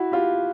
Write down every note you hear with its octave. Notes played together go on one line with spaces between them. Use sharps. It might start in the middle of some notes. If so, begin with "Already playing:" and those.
Already playing: E4 F#4
F4 G4